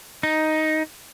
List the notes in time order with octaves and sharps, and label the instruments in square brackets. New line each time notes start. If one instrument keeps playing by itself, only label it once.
[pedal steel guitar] D#4